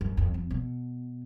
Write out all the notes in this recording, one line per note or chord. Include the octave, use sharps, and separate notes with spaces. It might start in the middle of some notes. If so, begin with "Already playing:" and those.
F#2
F2
F2
B2